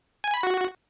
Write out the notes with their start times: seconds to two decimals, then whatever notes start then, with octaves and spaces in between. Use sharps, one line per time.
0.24 G#5
0.34 B5
0.43 F#4